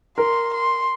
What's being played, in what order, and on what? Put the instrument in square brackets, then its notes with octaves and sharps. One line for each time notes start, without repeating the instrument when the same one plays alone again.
[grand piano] A#4 [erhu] C6
[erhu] C6